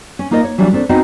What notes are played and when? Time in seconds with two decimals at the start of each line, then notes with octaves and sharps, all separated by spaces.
0.19 C#4
0.31 A#3 D#4 F4 A#4 D5 D#5
0.44 C#5
0.58 E3 F#3 G3 D4 E4 F#4
0.72 D#2 A3 C4 D4 A4
0.89 B3 C4 D#4 F#4 B4 D#5